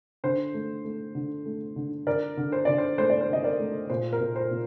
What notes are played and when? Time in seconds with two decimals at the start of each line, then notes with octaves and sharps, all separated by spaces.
0.24 D3 C5
0.54 A3
0.85 A3
1.15 D3
1.46 A3
1.76 D3
2.07 D3 A#4 D5
2.37 D3
2.52 C5
2.65 D3 D5
2.78 C5
2.98 A3 C5
3.10 D5
3.21 C5
3.29 D3 D#5
3.44 A#4 D5
3.59 A3
3.90 A#2 C5
4.13 A#4
4.20 A#2
4.36 C5
4.51 A#2